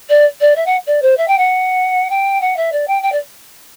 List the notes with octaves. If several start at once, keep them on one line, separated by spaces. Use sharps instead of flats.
D5
D5
E5
F#5
D5
C5
E5
G5
F#5
G5
F#5
E5
D5
G5
G5
D5